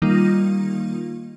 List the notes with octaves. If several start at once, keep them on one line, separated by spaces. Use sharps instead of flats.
D#3 G3 A#3 D#4 F4